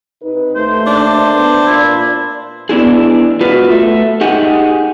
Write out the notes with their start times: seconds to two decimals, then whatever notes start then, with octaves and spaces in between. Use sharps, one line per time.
0.23 C3 D#4 B4
0.56 D#2 A3 C5
0.87 D4
1.32 B3
1.66 A#2 E4
2.69 B3 D4 E4 G#4
3.41 F4 F#4 B4
3.70 A3
4.21 D#4 G4 G#4 F#5